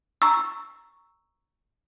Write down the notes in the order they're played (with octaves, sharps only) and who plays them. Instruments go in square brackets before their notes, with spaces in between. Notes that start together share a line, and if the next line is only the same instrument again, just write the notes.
[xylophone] A#5 C#6 E6